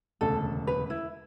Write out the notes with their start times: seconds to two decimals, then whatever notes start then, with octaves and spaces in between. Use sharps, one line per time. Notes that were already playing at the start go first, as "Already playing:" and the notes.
0.21 E1 D2 C#3 A4
0.67 B4
0.90 E4